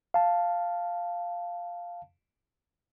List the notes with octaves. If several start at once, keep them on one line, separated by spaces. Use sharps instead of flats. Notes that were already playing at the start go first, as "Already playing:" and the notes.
F5 A5